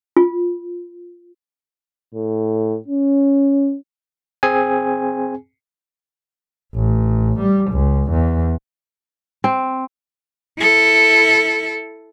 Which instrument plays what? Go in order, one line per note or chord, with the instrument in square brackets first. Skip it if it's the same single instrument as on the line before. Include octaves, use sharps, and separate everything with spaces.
[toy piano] F4
[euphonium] A2
C#4
[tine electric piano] C4 G#4 G#5
[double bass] A1
G3
C#2
E2
[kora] C4
[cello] E4 A4